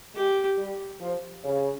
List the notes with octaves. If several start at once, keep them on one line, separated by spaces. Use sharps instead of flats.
G#3 G4
G3
F3
C#3